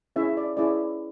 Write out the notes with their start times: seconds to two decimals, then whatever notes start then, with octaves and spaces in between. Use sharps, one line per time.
0.16 C#4 E4 G#4 C#5 E5
0.37 D5
0.57 C#4 E4 G#4 C#5 D5